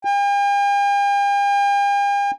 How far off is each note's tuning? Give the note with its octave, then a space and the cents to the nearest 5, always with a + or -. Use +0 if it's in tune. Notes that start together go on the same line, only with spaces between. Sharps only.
G5 +45